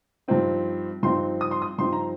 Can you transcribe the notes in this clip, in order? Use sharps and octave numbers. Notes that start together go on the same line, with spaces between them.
G2 F3 C4 D#4
G2 F3 C4 D#4 C6
D#6
C6
D#6
G2 F3 C4 D#4 C6
A#5